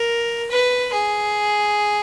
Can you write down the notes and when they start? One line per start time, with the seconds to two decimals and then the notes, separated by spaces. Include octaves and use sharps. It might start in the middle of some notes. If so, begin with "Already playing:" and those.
Already playing: A#4
0.51 B4
0.94 G#4